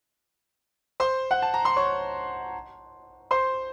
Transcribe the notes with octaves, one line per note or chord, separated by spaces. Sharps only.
C5 C6
F#5
A5
A#5
C6
C#5 C#6
C5 C6